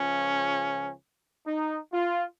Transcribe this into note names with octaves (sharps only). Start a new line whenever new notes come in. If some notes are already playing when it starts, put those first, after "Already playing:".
Already playing: C#2 C#3 F3 C#4
D#4
F4